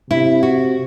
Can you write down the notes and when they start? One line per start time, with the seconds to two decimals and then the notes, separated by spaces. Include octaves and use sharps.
0.10 C3 E4
0.43 F#4